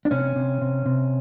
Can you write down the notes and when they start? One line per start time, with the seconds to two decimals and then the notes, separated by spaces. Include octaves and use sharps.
0.05 D4
0.11 C3 C#4
0.36 C3
0.61 C3
0.86 C3